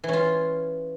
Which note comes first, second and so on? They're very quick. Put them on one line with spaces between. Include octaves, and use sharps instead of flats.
E3 C#4 F4